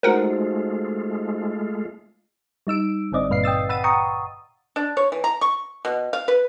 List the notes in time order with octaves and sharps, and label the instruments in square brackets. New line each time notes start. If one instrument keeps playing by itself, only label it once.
[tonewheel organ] G#3 A3 F4 [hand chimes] D#4 F#4 C5 [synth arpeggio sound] A#4 F#5
[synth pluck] G3 D#4 E6 D7
G#1 D3 C4 D5 D#5
G2 A#2 B4 F5 C7
G5 D#6 E6 A6
F#5 B5 E6 A6 D#7
F#5 G5 A#5 C#6 D#6
[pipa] D4
C#5
E3
A#5
C#6
B2
F5
B4